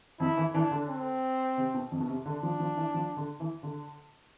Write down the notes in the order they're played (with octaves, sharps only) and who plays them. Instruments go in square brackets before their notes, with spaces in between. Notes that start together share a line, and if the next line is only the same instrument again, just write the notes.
[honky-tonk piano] F2 [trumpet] E4
[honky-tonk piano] E3
[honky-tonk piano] E3 [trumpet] D4
[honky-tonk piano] D3
[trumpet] C4
[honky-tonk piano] C3
B2
F2
B2
C3
[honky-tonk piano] D3 [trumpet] D4
[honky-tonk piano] F3
F3
E3
F3
D3
E3
D3